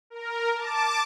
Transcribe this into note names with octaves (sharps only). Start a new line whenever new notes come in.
A#4
A5 D6